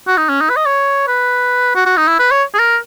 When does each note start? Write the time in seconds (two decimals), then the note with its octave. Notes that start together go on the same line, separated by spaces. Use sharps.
0.07 F#4
0.18 D#4
0.29 C#4
0.41 D#4
0.49 B4
0.57 D#5
0.66 C#5
1.08 B4
1.75 F#4
1.86 F#4
1.97 D#4
2.08 E4
2.19 B4
2.31 C#5
2.54 G#4
2.59 A#4